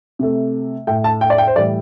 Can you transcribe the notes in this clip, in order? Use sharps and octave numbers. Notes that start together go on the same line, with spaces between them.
C3 A3
A2 A3 G5
A5
G5
D5
G5
C5
A2 E3 G3 D5